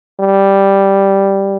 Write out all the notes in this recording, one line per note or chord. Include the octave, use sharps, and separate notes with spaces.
G3